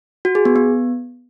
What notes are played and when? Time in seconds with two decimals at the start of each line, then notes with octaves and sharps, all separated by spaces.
0.25 F#4
0.35 G#4
0.45 B3
0.56 B3